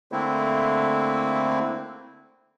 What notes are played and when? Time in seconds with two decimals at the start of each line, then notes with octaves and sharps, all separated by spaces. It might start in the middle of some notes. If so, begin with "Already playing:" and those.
0.12 D3 A3 A#3 C4 E4